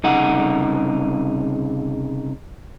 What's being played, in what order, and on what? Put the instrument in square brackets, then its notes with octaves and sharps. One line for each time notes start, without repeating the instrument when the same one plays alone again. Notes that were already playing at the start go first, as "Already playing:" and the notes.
[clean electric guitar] C2 C#3 D#4 F#5